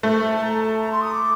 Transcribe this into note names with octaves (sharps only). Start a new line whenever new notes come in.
A3 C5
A#4
C5
A5
A#5
A5
A#5
C6
D#6
D6